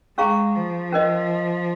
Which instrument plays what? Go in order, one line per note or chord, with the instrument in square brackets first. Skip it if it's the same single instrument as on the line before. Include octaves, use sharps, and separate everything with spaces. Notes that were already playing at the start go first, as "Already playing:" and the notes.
[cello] G#3 [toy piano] C#4 G#4 F5 A#5 C#6
[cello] F3
[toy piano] C#4 A#4 D#5